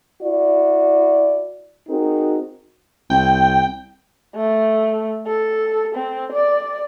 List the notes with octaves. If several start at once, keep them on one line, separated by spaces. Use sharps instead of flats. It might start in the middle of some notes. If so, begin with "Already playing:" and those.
E4 F#4 D5
C4 D#4 F#4 G#4 A#4
C2 G5
A3
A4
C4
D5